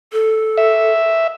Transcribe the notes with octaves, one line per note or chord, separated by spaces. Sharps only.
A4
E5